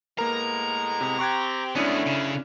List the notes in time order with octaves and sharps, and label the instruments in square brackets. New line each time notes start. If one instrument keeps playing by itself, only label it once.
[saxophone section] A2 G#3 B3 [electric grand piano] A#3 A#4 [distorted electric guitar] A#5
[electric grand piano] C3
[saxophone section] C4 G4 [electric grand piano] C#6 F#6 G#6
[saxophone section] F#2 D3 A3 [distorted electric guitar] G#3 B3 [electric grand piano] C#4 D4 E4
[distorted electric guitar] C#3